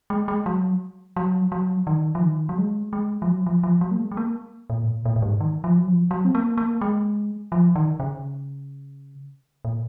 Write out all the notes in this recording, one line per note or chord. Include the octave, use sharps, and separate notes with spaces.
G#3
G#3
F#3
F#3
F#3
D#3
F3
D#3
F#3
G#3
G#3
F3
F#3
F3
F3
F#3
A#3
G#3
G#3
A#3
A#2
G#2
A#2
A#2
A#2
G#2
D#3
F3
F#3
F3
F#3
C4
A#3
A#3
G#3
F3
D#3
C#3
A#2